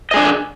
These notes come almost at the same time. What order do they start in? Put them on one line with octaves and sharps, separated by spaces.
D#5 G#4 D4